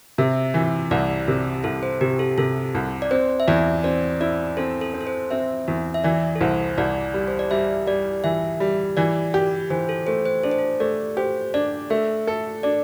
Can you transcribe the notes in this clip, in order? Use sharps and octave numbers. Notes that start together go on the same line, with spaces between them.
C3 E5
E3
C2 D5
C3
C2 A4
C5
C3 G4
A4
C3 A4
C2
D5
C4 C5
E5
E2 D5
C4 D5
E4 D5
C4 A4
A4
C4
A4
C5
C4 E5
E2
E5
E3 D5
A4
C2 C5
C2 D5
G3
C5
D5
G3 E5
G3 D5
E3 E5
G3
E3 D5
G4
E3 C5
A4
A3 C5
C5
D4 A4
C5
A4
A3 D5
G4 C5
D4 D5
A3 E5
A4
D4 D5